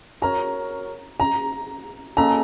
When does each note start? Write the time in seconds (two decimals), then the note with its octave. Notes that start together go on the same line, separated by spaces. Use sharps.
0.22 F#4 A#4 C#5 A#5
1.20 A#5
2.17 A#3 C#4 A4 D#5 A5 A#5